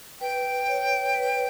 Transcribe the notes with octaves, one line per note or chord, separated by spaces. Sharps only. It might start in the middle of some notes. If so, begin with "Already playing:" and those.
B4 G5
C#5
B4